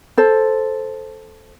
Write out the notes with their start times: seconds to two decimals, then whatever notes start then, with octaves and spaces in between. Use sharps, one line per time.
0.18 A4 C5